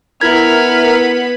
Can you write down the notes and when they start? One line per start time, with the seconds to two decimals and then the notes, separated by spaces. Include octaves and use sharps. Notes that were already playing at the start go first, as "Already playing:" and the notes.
0.21 B3 E4 A#4 B5 F6 G#6